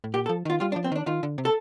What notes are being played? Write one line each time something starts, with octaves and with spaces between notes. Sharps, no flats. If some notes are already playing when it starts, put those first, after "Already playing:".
A2
A#2 G4
A4
F3
D#3 F4
G3 F4
D4
F3
C4
D#3 D4
D#3 F4
D3
C3
A4